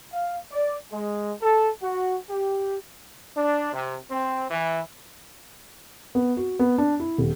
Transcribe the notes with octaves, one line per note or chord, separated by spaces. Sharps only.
F5
D5
G#3
A4
F#4
G4
D4
C3
C4
E3
B3
F#4
B3
D4
E4
D#1